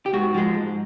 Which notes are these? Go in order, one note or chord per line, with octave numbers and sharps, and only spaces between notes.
G4
G#2 F#4
F3 G#3
G#2